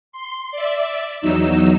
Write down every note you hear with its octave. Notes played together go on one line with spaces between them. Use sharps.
C6
D5 E5
E2 F#3 D#4 E6